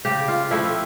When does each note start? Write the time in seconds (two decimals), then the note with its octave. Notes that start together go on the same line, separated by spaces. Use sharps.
0.05 C#3 G4
0.28 F4
0.51 F3 A3 C4 E4